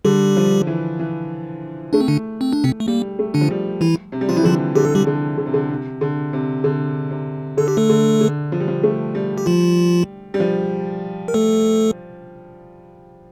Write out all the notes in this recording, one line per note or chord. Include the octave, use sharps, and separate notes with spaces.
D3 G3 G4
F3
E3
E3
A3 D4
C4
D3 D4
C4
D4
C3 C4
A3
G3 A#3
A3
D3 D4
F3
G3
E3 E4
C3
G3
F3 F4
E3 E4
D3 F3 F4
D3 G4
A4
G3 G4
D3
D3
C3
D3
C3
D3
C3
D3
C3
D3 A4
G4
A3 A4
D3
D3
F3
G3
F3
A3
G3
G4
F3 F4
G3
F3
A#4
A3 A4